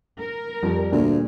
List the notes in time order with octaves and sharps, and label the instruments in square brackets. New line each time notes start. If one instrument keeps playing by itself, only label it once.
[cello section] A#4
[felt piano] F2 [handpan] G3
[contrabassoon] D2 [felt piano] A#2